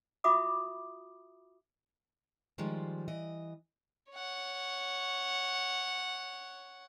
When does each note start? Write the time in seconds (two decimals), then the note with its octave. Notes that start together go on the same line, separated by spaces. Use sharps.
0.24 F4 F#4 E5 B5 D6 D#6
2.58 D#3 F3 G3 G#3
3.08 E3 D#5
4.10 C#5 F#5